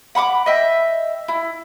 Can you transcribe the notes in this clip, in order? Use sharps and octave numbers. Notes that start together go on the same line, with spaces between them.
F#5 B5 C#6 D6
D#5 E5 G5
E4